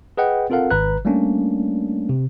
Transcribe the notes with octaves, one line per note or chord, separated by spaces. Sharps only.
G#4 B4 D#5 F#5 G5
C4 F4 A4 A#4 F5 F#5
G#1 B4 A#5 F#6
G3 A3 A#3 C#4 D4
C3